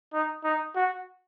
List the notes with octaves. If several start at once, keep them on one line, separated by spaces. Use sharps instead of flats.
D#4
D#4
F#4